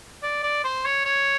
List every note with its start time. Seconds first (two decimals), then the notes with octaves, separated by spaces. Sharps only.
0.23 D5
0.43 D5
0.64 C5
0.85 C#5
1.05 C#5